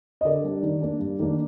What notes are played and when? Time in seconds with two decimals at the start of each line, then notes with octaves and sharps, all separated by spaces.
0.21 D#5
0.25 D3 A#4 D5
0.44 G3 D4
0.63 D#3
0.81 A#3 D4
1.00 G2
1.19 D#3 A#3 D4